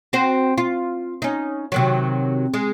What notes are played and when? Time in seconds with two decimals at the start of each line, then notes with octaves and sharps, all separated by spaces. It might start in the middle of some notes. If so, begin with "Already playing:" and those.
0.13 C4 F#4 C5
0.58 F4
1.22 C#4 D#4
1.72 C3 D#3 F#3
2.54 G#3